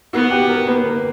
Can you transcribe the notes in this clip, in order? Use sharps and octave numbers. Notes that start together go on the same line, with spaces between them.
B3 F#4
G4
A#4
A#3 B4
A#4